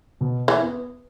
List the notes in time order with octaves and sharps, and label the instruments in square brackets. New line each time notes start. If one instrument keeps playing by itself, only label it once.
[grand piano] B2
[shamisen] E3
[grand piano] B3